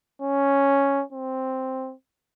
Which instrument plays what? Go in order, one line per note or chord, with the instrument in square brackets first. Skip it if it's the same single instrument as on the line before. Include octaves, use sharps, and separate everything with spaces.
[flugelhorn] C#4
C4